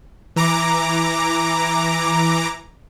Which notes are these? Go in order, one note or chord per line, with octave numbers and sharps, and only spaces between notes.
E3 A#5 D6